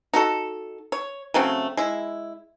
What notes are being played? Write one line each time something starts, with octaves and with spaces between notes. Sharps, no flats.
D#4 F#4 A4
C#5
C#3 F#3 A3 C4
G#3 E4